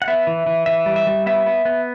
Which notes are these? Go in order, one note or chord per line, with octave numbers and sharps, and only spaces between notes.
F#5
B3 E5
E3
E3
E3 E5
G3
E5
G3
B3 E5
B3
B3